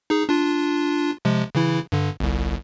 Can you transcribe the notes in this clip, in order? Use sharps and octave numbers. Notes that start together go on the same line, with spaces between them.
D#4 G#4
D4 F4
C3 F3 G#3
C#3 E3 E4
G2 D3
G1 C2